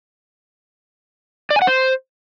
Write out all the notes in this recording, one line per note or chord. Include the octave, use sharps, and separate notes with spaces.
D5
G#5
F#5
C5